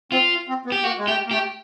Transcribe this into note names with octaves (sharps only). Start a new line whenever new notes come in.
C4 F4
C4
B3
G4
A#3 F#4
G#3
A3 G4
A#3
A3 G4